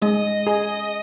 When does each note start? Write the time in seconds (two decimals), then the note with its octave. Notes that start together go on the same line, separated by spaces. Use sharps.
0.02 G#3 D#5
0.47 G#4